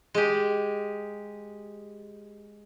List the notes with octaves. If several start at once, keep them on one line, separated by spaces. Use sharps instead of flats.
G#3 G4